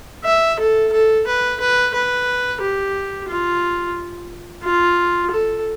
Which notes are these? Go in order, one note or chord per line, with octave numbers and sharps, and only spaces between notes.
E5
A4
A4
B4
B4
B4
G4
F4
F4
A4